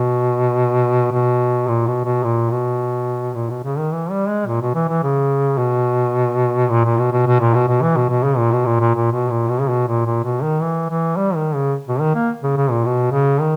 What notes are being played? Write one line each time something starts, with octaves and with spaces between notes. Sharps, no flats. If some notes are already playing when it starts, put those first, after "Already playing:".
Already playing: B2
B2
A#2
B2
B2
A#2
B2
A#2
B2
C#3
D#3
E3
G3
G#3
A#2
B2
E3
E3
C#3
B2
A#2
A#2
B2
B2
B2
A#2
B2
B2
E3
B2
B2
C#3
A#2
B2
A#2
A#2
A#2
B2
A#2
B2
C#3
B2
A#2
A#2
B2
D#3
E3
E3
G3
D#3
C#3
B2
D#3
A#3
C#3
C#3
A#2
B2
C#3
D#3